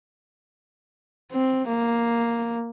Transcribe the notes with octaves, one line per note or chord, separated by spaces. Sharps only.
C4
A#3